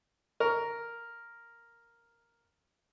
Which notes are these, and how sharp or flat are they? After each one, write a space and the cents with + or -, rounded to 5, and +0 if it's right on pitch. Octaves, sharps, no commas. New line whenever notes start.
A#4 +0 C#6 +20